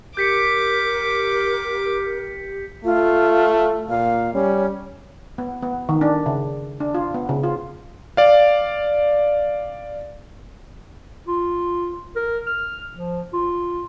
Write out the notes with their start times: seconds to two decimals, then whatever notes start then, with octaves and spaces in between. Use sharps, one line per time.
0.17 G4 A#4 D6 G6 B6 C#7
2.85 A3 F4
3.89 A#2 F5
4.34 G3 C#4
5.38 B3
5.62 B3
5.89 D#3
6.01 D4
6.26 C#3
6.80 D4
6.94 F4
7.14 B3
7.29 C#3
7.44 F4
8.17 D5 F5
11.28 F4
12.16 A#4
12.47 F6
12.95 F3
13.34 F4